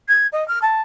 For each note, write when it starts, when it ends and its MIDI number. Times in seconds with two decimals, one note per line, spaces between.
0.08 0.27 92
0.32 0.46 75
0.48 0.59 89
0.62 0.82 81